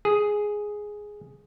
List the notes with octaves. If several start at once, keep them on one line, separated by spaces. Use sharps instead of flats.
G#4